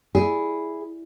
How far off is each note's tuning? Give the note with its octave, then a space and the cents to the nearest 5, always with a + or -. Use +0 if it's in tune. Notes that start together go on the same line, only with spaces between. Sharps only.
E4 +0 G#4 +0 D5 +0